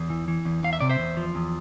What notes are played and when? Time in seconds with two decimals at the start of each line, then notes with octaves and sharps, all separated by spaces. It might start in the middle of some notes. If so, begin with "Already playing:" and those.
Already playing: E2
0.10 E3
0.28 E3
0.45 E2
0.63 E2 F5
0.73 E5
0.81 C3 D5
0.89 C5 E5
0.99 E2
1.17 F3
1.35 E2